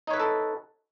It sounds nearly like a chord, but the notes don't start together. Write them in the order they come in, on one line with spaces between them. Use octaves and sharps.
D#4 C#5 B4 E5 A4